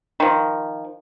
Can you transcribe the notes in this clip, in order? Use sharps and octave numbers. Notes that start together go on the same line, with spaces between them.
D#3 F3